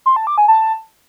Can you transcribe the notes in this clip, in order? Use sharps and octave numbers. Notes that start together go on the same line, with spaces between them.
C6
A5
D6
G#5
A5